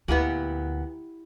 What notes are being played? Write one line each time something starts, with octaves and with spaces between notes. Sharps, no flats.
D2 A#2 B3 E4 G4 F#5